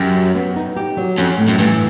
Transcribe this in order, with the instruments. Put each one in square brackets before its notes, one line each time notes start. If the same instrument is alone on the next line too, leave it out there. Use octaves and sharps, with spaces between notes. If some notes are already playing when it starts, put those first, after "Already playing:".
Already playing: [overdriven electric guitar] F#2 [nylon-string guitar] G4
[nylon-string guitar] F#3
B3
D#4
G4
F#3
[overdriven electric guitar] F2 [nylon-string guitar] C#4
[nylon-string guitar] A2
[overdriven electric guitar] F#2
[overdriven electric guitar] G2 [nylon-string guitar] E3